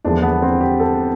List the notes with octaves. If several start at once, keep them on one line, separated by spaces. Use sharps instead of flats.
E1 E2 D3 F3 D4
B3
C4
G4
A4